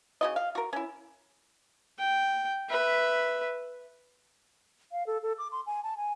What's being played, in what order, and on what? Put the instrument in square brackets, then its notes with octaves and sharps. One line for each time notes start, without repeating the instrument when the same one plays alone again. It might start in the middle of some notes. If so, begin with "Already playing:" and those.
[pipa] C#3 F#4 D#5
F5
F#4 A#4
C#4 E4
[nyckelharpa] G5
B4 E5
[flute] F5
A4
A4
D6
C6
G#5
A5
G#5